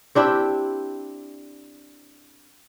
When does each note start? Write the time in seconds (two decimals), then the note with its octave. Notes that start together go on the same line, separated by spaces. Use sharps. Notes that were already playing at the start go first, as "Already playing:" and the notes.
0.15 C4 D4 E4 G4